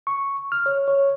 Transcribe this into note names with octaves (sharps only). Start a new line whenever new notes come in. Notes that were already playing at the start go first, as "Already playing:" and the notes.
C#6
F6
C#5
C#5